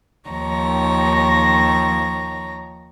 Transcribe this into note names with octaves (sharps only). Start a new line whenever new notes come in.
D#2 D#3 F3 C#5 A#5 A#6